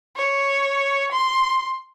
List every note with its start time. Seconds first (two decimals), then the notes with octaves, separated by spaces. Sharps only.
0.16 C#5
1.11 C6